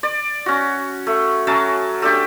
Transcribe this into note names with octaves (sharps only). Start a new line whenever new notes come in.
D5
C#4 F#4
A3
F#3 C#4 F#4 A5
A3 D4 G4